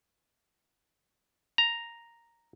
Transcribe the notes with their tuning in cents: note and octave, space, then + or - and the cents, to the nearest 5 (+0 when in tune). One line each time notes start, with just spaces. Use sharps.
A#5 +0